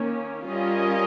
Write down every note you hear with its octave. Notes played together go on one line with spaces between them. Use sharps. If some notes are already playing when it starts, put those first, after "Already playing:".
Already playing: D#3 A#3 C#4
G3 C#4 F4 A#4 D#5